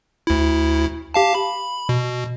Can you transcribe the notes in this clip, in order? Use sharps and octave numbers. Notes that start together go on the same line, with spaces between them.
D2 E4
G4 F5 A5
B5
B2